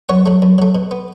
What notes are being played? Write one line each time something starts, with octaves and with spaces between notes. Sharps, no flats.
F#2 C#5 F#5
F#3 A3
F#2
F#3 A3
B2
B3